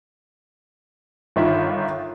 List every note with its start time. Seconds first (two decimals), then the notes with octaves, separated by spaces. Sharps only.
1.36 G1 D#3 F4 E5